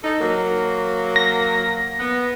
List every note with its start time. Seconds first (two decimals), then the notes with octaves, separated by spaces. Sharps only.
0.04 D#4 A4
0.21 F#3 A#3
1.16 A#6
2.00 B3